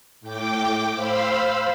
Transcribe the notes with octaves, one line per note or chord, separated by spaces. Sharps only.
A2 G5 D6
C5 F5 B5 E6